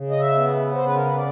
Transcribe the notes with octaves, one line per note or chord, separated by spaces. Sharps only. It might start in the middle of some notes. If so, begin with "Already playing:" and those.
Already playing: C#3
D#5
E5
B3
C#3 C5
B4
A#4
B4
D5